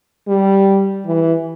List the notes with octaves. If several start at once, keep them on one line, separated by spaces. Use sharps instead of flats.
G3
E3